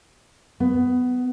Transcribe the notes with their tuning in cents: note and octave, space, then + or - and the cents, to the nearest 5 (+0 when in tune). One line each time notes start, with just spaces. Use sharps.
B3 +15